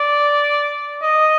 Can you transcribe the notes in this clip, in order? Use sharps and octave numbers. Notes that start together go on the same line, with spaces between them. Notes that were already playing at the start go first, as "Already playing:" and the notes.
Already playing: D5
D#5